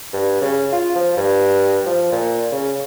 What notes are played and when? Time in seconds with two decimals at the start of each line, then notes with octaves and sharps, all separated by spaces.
0.14 G2
0.41 C#3
0.72 F4
0.95 F3
1.17 G2
1.86 F3
2.12 A#2
2.52 C#3